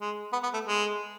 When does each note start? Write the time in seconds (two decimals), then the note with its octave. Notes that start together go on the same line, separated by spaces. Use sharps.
0.01 G#3
0.33 B3
0.43 B3
0.54 A3
0.65 G#3